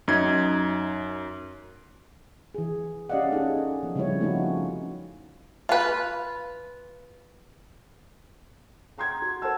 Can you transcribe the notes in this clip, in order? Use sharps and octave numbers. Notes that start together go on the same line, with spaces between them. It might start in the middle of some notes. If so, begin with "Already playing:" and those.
F#2 D#4 G#6
E3 G#4
C#4 G4 D5 D#5 F5 F#5
C#4 D#4 G#4 A4
F3 B3
C#3 F3 G3 C4 E4 C#5
A3 B3 C#4 D#4 F4 F#4
F4 B4
G5 A#5 C6 G6 G#6
F#4
A4 A#4 C5 F#5 A5 E6